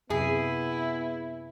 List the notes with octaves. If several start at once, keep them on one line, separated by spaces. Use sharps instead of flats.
F#2 C3 B3 E4 G#4